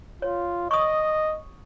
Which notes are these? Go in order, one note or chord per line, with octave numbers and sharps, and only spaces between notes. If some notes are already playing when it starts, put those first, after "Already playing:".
F4 C#5
D#5 C#6 D#6